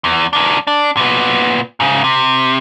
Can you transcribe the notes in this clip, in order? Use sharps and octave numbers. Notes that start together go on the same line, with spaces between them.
E2
D#3 D4
D4
A#2 B3
G#2 C#3
C3